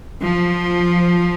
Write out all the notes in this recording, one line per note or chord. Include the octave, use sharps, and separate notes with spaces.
F3